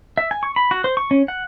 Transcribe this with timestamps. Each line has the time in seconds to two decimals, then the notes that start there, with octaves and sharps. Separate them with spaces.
0.18 E5
0.31 G#5
0.43 C#6
0.56 B5
0.71 F#4
0.84 C5
0.97 C#6
1.11 C#4
1.28 F#5